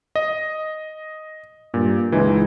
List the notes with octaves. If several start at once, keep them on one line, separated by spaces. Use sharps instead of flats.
D#5
G2 A#2
C#2 E3 G#3 D#4